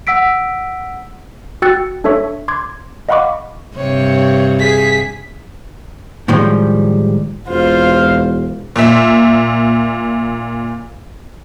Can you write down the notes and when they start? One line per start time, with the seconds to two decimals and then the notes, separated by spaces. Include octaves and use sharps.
0.07 F#5 E6 B6 D7
1.62 F#4 G5 E6 F#6 A6 C#7
2.04 D4 A4 C#5 E5 C#6
2.48 C6 D6 G#6
3.09 D#5 F5 F#5 B5 C#6 D6
3.77 G2 C3 C#5
4.59 G#4 B6
6.28 A2 D#3 F3 G3 G#3
7.48 E1 F4 C5 F5
8.76 A#2 E5